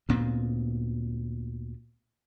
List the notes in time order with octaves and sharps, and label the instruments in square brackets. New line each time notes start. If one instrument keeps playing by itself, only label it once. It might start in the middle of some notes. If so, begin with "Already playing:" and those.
[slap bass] D2 A#2 B3 C4